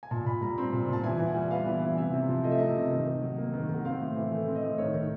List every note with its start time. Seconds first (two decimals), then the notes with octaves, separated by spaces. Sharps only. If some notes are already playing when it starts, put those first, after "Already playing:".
0.03 G#5
0.11 A#2 A5
0.26 A#2 B5
0.41 G3 A#5
0.58 C4
0.73 A#2
0.89 A#2 A5
1.03 E3 G#5
1.19 E3
1.27 F#5
1.35 G3
1.51 B3 F5
1.66 E3
1.82 E3
1.98 C3 E5
2.14 C3
2.29 F3
2.44 A3 D#5
2.51 E5
2.58 C3 D#5
2.75 C3
2.91 D#3
3.07 D#3
3.22 F#3
3.38 A#3
3.53 D#3
3.69 D#3 F#5
3.85 C4 F5
4.00 A2
4.16 E3
4.31 A3
4.48 C4
4.55 D#5
4.64 A2
4.78 D#3 C#5
4.95 D#3